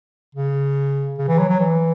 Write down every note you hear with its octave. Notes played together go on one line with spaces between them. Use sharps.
C#3
C#3
E3
F#3
F#3
E3